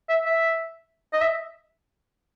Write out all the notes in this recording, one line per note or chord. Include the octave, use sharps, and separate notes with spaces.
E5
E5
D#5
E5